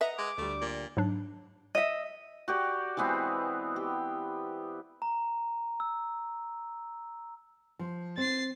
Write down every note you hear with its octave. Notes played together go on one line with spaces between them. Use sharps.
B4 D#5 E5 F#5 A#5
G#3 D6
D2 G3 A3
A#2
G#2 F#3 D4
D#5 E5
F#4 G4 D5
E3 G#3 B3 C4
G4
A#5
E6
F3
C4 A6 C7